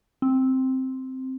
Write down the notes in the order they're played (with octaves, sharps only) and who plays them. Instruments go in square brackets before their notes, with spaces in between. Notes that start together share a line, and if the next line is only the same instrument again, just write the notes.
[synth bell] C4